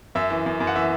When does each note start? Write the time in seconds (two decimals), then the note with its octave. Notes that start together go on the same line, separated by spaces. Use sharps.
0.15 F#2 E5
0.30 E3
0.46 F#2
0.60 F#2
0.67 F#5
0.75 E3 E5